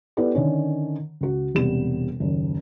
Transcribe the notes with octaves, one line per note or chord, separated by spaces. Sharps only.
B3 E4 G4 A4 B4 D5
D3 D#3 C#4
C#2 F#4
E1 C3 G3 B3 E7
F#1 D#2